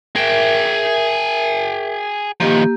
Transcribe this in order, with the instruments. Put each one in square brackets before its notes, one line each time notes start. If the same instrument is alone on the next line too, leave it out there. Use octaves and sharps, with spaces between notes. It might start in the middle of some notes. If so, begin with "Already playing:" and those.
[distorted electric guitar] G#4 G5 [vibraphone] A#4 E5
[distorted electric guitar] D#3 F3 [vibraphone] A#3 G4